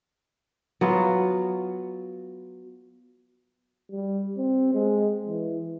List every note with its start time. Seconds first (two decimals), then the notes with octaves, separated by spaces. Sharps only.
0.81 F#3 B3 F4
3.92 G3
4.37 C4
4.74 G#3
5.28 E3